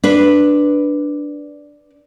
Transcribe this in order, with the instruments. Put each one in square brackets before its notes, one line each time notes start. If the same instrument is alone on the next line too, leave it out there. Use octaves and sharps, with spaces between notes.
[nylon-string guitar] D4 B4